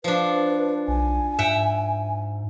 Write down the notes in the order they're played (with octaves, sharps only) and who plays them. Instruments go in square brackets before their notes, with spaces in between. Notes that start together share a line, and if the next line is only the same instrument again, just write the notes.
[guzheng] F3 D4 [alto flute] B4
[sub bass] B1 [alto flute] G#5
[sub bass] G#2 [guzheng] E5 F#5 G5